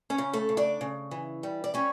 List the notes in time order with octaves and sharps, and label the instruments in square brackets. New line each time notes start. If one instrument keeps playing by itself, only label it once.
[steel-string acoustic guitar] C#4 C#5
C#3
A3 A4
C#3
D4 D5
C#3
E3
G3
D5
G3 C#4 C#5